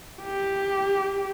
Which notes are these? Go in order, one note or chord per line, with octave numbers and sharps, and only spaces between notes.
G4